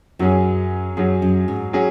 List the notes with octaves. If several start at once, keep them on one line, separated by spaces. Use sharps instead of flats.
F#2 F#3 C#4 G#4
F#2 F#3 C#4 G#4
F#2
G#2
F#3 C#4 G#4